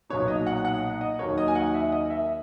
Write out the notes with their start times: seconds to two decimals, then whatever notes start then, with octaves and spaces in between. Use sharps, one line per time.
0.09 B1 A#2 F#3 B3 D#4 C#5
0.28 D#5
0.47 F#5
0.65 F#5
1.01 D#5
1.19 D#2 D#3 F#3 A#3 C#5
1.38 D#5
1.48 G#5
1.55 F#5
1.74 E5
1.92 D#5
2.10 E5